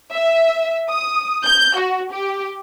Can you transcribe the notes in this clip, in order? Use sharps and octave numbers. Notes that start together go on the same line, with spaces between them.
E5
D#6
G6
F#4
G4